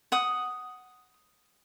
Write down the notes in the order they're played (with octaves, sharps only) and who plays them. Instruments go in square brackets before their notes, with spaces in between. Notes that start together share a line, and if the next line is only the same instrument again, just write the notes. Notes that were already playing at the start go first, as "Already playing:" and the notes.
[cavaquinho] F#5 D#6